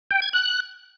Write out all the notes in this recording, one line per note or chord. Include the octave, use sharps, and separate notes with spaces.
G5
G#6
F#6